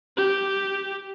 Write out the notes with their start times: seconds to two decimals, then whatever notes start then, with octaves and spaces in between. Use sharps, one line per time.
0.17 G4